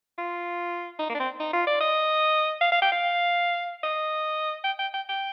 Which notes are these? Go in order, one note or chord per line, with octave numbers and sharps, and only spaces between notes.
F4
D#4
A#3
D4
C4
D#4
F4
D5
D#5
F5
F5
G5
F5
D#5
G5
G5
G5
G5